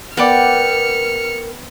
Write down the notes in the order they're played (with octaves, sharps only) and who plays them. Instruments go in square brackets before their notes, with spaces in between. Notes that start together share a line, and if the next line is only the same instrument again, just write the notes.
[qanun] B3 [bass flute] A#4 [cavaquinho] D5 F#5 G5 [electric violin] F6 C#7